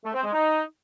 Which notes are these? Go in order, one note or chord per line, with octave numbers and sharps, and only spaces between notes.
A3
C4
G#3
D#4